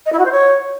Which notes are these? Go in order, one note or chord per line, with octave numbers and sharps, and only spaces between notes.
D#5
E4
F#4
C5
C#5